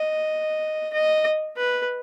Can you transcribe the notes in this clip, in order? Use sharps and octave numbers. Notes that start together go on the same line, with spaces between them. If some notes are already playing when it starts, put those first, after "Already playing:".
Already playing: D#5
D#5
B4